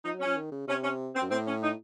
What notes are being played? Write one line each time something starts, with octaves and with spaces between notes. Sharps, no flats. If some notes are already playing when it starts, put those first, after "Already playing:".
F3 D#4
F#3
C#4
F3
D#3
C#3
C3 C#4
C#4
C4
F#2
A2 C4
C#4
D#4